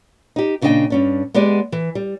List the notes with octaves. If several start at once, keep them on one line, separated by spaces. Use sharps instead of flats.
D#4 G4
A#2 C#3 D4 D#4 D#5 G5
G2 C#4 D4
G#3 B3 G4 G#4 D5
E3
G3